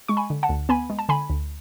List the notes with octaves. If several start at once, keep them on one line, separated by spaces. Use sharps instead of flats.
G#3 C#6
G#5 B5
D3
F#5 A5
D2
B3 G#5 B5
G#3
A5
D3 G#5 B5
D2